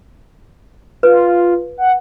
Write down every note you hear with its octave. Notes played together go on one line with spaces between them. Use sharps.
F4 B4
F#5